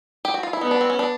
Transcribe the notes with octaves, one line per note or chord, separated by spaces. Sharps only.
G4
F#4
F4
E4
B3 D#4
D4
C4
C#4
D4